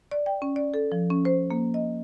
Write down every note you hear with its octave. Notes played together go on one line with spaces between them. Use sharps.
D5
G5
C#4
D5
A4
F3
C#4
C5
A#3
D#5